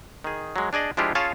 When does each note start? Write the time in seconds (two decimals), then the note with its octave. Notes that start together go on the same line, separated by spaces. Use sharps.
0.24 D#3 G#4
0.56 F#3 G#3
0.73 D4 G#4 D5 D#5
0.97 F3 G#3 D4 E4 F4 G4
1.15 C#4 F4 G#4 C#5 F5 A5